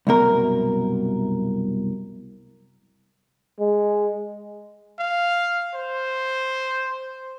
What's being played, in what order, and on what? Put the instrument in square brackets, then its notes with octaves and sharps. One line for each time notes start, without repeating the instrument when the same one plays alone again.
[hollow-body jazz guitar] C2 F#2 B2 A#4
[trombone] G#3
[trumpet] F5
C5